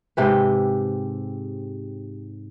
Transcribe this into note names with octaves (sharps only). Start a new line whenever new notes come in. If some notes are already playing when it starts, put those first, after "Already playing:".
G#2 C3 G4 B4